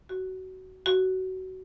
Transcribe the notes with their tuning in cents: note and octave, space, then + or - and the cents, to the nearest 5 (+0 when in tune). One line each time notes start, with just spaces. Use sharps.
F#4 +20
F#4 +20